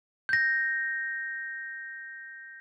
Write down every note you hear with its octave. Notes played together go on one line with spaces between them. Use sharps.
G6 A#6